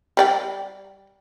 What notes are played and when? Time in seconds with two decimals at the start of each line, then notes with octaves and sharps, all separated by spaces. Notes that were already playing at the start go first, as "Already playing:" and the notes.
0.17 G3 D5 G5